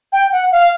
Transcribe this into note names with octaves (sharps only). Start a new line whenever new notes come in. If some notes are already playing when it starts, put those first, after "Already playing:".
G5
F#5
F5